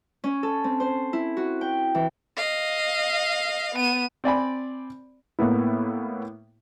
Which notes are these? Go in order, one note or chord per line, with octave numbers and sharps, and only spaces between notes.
C#4
A4
C4
C5
E4
F#4
G5
E3
D#5 F5
B3 D#7
C4 D5 G#5 B5
A2 A#3 B3 E4